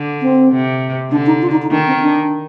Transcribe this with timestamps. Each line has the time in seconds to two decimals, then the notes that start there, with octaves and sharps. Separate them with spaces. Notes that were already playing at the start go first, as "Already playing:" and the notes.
Already playing: D3
0.21 C4
0.51 C3
1.11 D3 D4
1.26 D#4
1.42 F4
1.51 D#4
1.62 D#4
1.71 D#3 D4
1.87 C4
2.02 D4